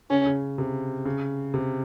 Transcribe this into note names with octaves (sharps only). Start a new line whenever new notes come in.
C#3 C#4
C#3
C3
C#3
C3